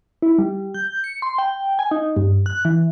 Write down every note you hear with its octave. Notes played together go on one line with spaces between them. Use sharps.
E4
G3
G6
C#7
C6
G5
G#5
D#4
G2
F#6
E3